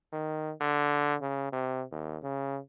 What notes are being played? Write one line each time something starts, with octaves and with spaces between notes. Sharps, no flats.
D#3
D3
C#3
C3
D#2
C#3